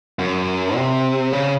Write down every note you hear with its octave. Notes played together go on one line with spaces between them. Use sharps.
F#2
C3
C#3